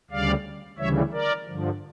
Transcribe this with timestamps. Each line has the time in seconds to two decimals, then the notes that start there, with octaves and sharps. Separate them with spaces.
0.11 D2 C#3 G3 D5 F5
0.78 D2 C#3 E3 G3 C#5 E5
1.12 A#4 D5
1.46 G2 D3 F3